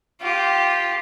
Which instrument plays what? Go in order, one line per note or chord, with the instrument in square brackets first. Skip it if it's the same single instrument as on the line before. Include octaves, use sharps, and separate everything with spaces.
[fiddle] F4 G4